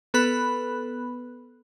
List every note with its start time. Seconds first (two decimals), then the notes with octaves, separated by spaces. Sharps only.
0.14 B3 A4 B4 B5 F#6